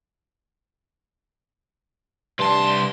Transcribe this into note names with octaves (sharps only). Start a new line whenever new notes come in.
C2 G2 A5 C6